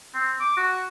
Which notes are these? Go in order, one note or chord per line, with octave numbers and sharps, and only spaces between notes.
C4
D6
F#4